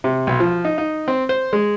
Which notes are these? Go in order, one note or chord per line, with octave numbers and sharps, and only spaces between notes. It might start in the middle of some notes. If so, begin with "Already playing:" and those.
C3
B1
F3
D#4
D#4
C4
C5
G#3